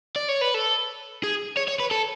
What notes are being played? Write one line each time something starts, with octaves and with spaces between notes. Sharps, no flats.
D5
C#5
B4
A4
G#4
C#5
C#5
B4
A4